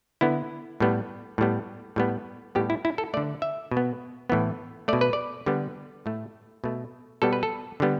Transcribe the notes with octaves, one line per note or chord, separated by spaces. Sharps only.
D3 B3 E4
A2 G3 B3
A2 G3 B3
A2 G3 B3
A2 G3 B3 G4
E4
E4
A4
D3 A3 D5
E5
B2
B3
A2 E3 B3
B2 A3 D5
B4
D5
D3 G3 B3
A2 A3
B2 A3
B2 G3 B3 A4
B4
A4
D3 G3 B3